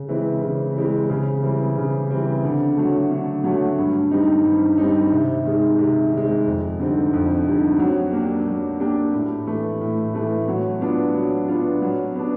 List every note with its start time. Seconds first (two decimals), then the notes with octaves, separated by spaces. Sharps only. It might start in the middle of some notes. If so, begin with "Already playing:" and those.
Already playing: C#3
0.09 E3 G#3 C4 E4
0.42 C#3
0.76 E3 G#3 C4 E4
1.10 C#3
1.43 E3 G3 C4
1.77 C#3
2.11 E3 G3 C4
2.44 D3
2.77 F#3 A3
3.11 D3
3.44 F#3 A3
3.78 G2
4.11 D#3 G3 C4 D#4
4.45 G2
4.78 D#3 G3 C4 D#4
5.12 C3
5.45 D#3 G#3
5.78 C3
6.13 D#3 G#3
6.46 F2
6.79 D3 G3 C4 D#4
7.13 F2
7.47 D3 G3 C4 D#4
7.79 F#3
8.13 A#3 D4 G4
8.47 F#3
8.80 A#3 D4 G4
9.14 A2
9.47 E3 A3
9.81 A2
10.14 E3 A3
10.48 F#3
10.81 B3 D4 F4
11.15 F#3
11.48 B3 D4 F4
11.82 F#3
12.15 B3 D4